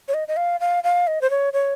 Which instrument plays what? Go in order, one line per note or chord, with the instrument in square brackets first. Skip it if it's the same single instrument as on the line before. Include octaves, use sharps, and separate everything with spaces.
[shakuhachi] C#5
D#5
D#5
F5
F5
F5
D#5
C5
C#5
C#5